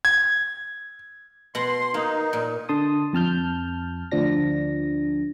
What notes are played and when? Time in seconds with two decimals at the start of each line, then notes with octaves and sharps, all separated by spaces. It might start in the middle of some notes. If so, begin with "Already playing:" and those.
0.05 G#6
1.55 B2 F#5 C6
1.94 A#3 D#4
2.33 A#2
2.69 D3 A5 C6 D#6
3.13 F2 A5 F6 G6
4.11 D2 F3 D4 A#6